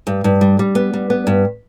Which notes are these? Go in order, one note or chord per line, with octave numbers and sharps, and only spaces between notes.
G2
G2
G3
G3
B3
G3
B3
G2